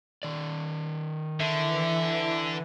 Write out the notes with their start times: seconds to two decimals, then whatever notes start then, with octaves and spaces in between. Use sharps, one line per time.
0.23 D#3 D5
1.40 D3 E3 E5